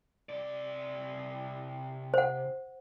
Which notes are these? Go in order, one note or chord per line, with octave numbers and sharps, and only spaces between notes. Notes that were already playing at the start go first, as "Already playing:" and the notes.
C3 D5
C5 F#5